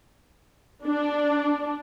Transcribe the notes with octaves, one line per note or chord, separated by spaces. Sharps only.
D4